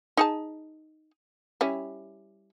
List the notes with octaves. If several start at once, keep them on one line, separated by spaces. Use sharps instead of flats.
D#4 G#4 A5
G3 C#4 E4